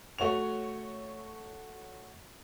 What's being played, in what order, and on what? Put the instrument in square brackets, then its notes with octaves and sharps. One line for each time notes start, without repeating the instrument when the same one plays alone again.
[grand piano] A3 F#4 C#5 F7